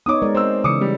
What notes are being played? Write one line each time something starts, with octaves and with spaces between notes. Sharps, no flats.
B3 D#4 C#5 D6 D#6
G#3 A#4 D5
C4 C5 E6
C#3 E3 D6 D#6 C#7
G3